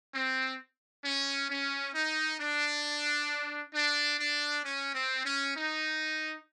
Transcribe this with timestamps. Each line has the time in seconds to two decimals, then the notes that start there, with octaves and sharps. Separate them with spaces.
0.15 C4
1.05 C#4
1.50 C#4
1.95 D#4
2.40 D4
3.75 D4
4.20 D4
4.65 C#4
4.95 C4
5.25 C#4
5.55 D#4